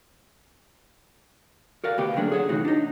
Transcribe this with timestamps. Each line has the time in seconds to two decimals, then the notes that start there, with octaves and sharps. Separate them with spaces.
1.84 F#4 A#4 D5 F5
1.98 D2 B2 B3 G4 F5
2.16 D3 F#3 A3 A#3 D4 G#4
2.32 G#4 C#5 F#5
2.49 A2 C3 E3 D#4 F#4
2.65 D4 D#4